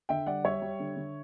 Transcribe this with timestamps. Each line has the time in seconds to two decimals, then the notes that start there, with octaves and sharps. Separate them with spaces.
0.09 D3 E5 G5
0.26 G3 D5 F#5
0.45 G3 C#5 E5
0.62 G3
0.80 D3
0.97 D3